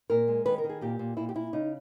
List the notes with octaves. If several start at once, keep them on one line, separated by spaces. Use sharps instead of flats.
A#2 A#4
G#3
D#3 B4
A#4
D#3
G#4
A#2 G4
A#2
A#2 E4
G4
A#2 E4
C#3 D#4